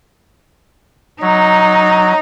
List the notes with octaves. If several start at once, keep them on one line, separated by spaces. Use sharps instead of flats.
F#3 D#4